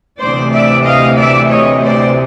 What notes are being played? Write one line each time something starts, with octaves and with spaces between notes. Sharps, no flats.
D2 C3 E3 C5 D5
D5 E5
D#5 F5
D5 E5
C#5 D#5
C5 D5